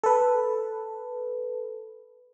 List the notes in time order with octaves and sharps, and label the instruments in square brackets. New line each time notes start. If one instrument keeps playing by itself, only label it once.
[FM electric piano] A4 B4